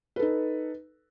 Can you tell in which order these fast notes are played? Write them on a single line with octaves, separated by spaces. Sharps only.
B4 A4 D#4